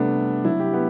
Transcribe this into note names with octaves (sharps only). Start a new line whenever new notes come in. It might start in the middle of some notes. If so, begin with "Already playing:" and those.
Already playing: C3 G3 A3 B3 D4
C3 F#3 E4
G4
B3